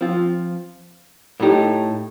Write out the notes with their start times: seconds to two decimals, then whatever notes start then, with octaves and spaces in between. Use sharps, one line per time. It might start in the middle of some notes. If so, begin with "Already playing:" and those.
0.01 F3 C4 F4
1.40 A2 A3 D#4 G4